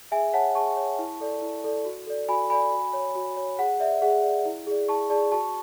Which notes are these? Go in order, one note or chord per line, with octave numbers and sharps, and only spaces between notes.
G#4 E5 G#5
C#5 F#5 A5
G#4 A5 C#6
C#5
E4
A4 D5
E4
A4 D5
F#4
A4 D5
F#4 G#5 B5
A4 D5 G#5 B5
F#4
C#5
F#4
C#5
G#4 F#5
D5 E5
G#4 F#5
D5
E4
G#4 D5
E4 A5 C#6
G#4 D5 A5 C#6
F#4 A5 C#6